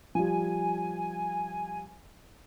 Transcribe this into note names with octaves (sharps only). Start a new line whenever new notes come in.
F3 G3 G#5